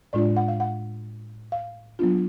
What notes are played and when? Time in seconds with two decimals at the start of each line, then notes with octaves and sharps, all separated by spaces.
0.13 A2 G#3 D4 F4 D5
0.37 F#5
0.48 F5
0.60 F#5
1.52 F5
1.99 F#3 B3 D4 F4